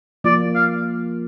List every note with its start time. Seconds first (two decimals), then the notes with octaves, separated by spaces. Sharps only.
0.24 F3 A#3 F4 D5
0.55 F5